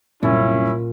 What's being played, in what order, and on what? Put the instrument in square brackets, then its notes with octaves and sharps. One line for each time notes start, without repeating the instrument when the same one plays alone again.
[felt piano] F#1 C2 [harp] A#2 [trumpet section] C#4 E4